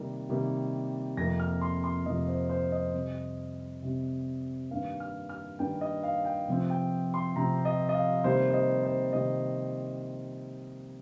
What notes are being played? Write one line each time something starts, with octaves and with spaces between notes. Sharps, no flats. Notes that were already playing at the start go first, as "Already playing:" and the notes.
Already playing: C3 D#3 G3 A#3
C3 D#3 G3 A#3
F2 C3 F3 A#3 A#6
F6
C6
C6
F2 C3 F3 A#3 D#5
C5
C5
D#5
C3 G3 C4
C3 G3 C4
G2 D#3 A#3 F5
F6
F6
G2 D#3 A#3 G5
D#5
F5
G5
C3 F3 C4
G5
C6
C3 F3 C4 A#5
D#5
D#5
F5
C3 D#3 G3 A#3 C5
C5
D#5
C5
C3 D#3 G3 A#3 D#5